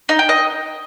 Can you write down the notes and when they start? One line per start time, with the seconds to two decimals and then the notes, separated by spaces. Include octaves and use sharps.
0.09 D#4
0.19 G5
0.29 D#5